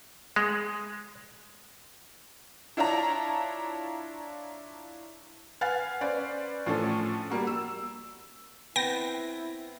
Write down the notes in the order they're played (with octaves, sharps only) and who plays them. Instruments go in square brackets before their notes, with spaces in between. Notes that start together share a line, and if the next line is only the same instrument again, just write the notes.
[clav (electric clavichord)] G#3
[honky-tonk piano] D4 E4 F4 C#5 A5 A#5
[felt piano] B4 F5 F#5 G#5 F6 A6
C#4 B4 C5 D5
A2 F3 C#4 D4 A4
G3 A#3 F#4
E6
[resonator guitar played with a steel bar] B3 C4 [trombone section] E4 [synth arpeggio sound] G5 A#6